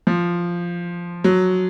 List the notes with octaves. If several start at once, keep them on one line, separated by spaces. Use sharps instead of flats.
F3
F#3